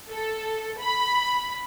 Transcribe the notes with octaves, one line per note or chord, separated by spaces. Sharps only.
A4
B5